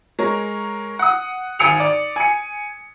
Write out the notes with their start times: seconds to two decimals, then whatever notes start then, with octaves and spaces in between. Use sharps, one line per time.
0.19 G#3 A#4 C#5
0.99 F#5 D#6
1.59 G#1 G#5 D#6 C#7 D7 F7
1.80 D5
2.16 G#5 C#7